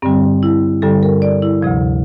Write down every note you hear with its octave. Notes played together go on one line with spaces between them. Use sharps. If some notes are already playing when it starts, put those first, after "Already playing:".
G2 D3 G3 C4
E4
G2 D3 G3 A4
A#4
D5
E4
D2 C3 F3